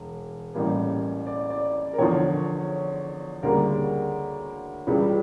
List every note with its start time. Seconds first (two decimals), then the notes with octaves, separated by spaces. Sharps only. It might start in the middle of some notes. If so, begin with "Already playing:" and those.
Already playing: E1
0.54 A1 A2 G3 A#3
1.27 D5
1.50 D5
1.93 A#4
1.98 E2 D3 F3 C#5
3.43 D2 C#3 G3 A#3 A#4
4.87 C#2 C#3 E3 G3